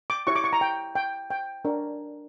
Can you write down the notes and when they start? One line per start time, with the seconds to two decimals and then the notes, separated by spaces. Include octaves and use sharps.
0.10 D6
0.27 E4 G4 C#5 C#6
0.36 D6
0.44 C#6
0.53 A#5
0.61 G5
0.96 G5
1.30 G5
1.65 D4 A#4 C#5